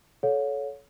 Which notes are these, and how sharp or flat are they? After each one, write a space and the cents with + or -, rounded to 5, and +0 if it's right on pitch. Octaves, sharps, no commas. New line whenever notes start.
A4 -25 C#5 +15 F5 +45